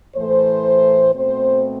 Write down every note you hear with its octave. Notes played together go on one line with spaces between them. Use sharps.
A2 E3 A3 C5
B2 A3 C4 C5